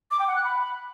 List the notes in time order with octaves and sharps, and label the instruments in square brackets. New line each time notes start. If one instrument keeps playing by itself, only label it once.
[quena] D6
G5
F#5
F#6
B5